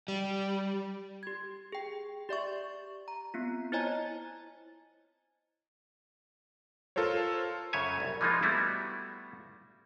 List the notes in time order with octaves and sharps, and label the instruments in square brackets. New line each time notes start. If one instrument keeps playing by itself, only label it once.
[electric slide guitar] G3
[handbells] G4 G#6
G#4 G5
G4 D5 E5 C#6
A#5
B3 C4 F4
E4 C5 C#5 D#5 G#5 A#5
[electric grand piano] F4 A4 A#4 C5 C#5
[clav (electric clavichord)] F#2 C#3 C#5 E5 G#5
C2
E3 F3 G#3 A#3 D#4 F4
G3 A3 B3 E4 F#4